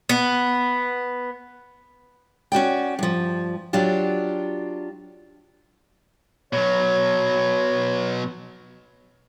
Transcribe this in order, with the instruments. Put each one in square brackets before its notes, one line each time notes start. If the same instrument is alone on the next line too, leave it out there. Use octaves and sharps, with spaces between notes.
[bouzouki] B3
[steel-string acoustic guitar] C#4 F#4 D5 G5
G2 F3
F#3 D4 F4 G4
[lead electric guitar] B2 F#3 [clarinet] C#5